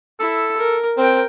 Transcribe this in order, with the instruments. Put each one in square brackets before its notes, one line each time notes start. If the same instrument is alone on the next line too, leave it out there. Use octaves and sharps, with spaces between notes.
[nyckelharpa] E4 [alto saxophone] A4
[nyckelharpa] A#4
[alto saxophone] C4 [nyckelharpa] A#4 G5